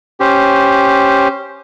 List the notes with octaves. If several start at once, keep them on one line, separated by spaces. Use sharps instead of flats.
C#4 G4 C5